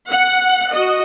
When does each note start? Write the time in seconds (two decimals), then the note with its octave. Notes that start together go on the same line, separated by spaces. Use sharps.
0.10 F#5
0.74 F#4 D#5